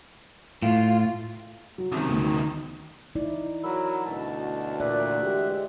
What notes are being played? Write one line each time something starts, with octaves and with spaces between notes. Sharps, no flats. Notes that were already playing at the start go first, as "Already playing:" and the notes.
A2 F4
F#3
C2 C3 D#3 C#4
D2 B3
D#4 E4 D5
F#3 A#4 B5 E6
D2 B2 A5
A#2 E3 D5 E5 F#6
G#3 G4